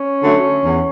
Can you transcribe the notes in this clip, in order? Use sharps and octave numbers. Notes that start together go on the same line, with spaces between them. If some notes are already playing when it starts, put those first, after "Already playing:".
Already playing: C#4
D3 F#3 A3
E2